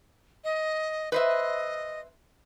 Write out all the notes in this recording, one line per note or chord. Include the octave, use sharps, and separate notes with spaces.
D#5
B4 C5 D#5 E5